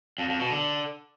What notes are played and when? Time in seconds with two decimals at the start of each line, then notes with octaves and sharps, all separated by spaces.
0.18 F2
0.29 F2
0.40 B2
0.50 D3